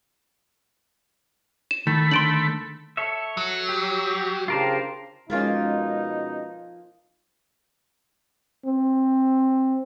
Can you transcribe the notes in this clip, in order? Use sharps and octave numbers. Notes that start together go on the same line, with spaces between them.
E7
D#3 A3 B5
D3 D#3 D4 C6 D7 F#7
A4 C#5 E5
F#3
G4
C#3 D4 F4 G4 A#4 C5
B2 F3 G#3 A#3 C#4 D#4 F4
C4